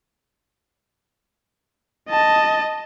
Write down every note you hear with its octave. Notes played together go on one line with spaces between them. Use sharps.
D#5 A5